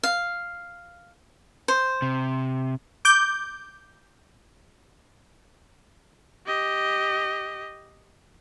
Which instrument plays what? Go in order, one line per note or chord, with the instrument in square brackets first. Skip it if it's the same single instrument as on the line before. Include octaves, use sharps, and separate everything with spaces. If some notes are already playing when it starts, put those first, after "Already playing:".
[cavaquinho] F5
C5
[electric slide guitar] C3
[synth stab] D6 G6
[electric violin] G4 D#5